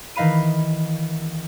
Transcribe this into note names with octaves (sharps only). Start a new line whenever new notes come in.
D#3 E3 D#5 F5 B5 D#7